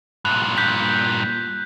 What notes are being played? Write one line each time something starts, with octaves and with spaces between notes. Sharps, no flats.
G2 A#2 F#6
F#6 G6 B6